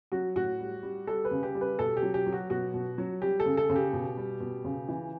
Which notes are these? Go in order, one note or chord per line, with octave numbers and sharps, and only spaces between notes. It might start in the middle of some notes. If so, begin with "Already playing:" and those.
F#3 F#4
A2 F#4
G3
G3
G3 A4
B4
C#3
G4
G3
B4
B2 A4
G4
F#3
G4
F#3
F#4
B2 F#4
B2
F#3
G3 G4
A4
C#3
A4
C#3
G4
B2
G3
B2
C#3
E3